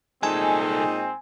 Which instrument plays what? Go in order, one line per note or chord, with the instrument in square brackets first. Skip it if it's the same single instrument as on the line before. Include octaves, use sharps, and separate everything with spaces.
[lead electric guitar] C2 A4 [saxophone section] A#2 G#3 D#4 [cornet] C4 [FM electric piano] G#5